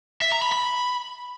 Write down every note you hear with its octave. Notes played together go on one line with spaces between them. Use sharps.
E5
A#5
B5
B5